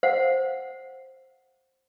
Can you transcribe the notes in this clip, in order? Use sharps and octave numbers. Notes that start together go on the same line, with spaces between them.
C5 F5 F#5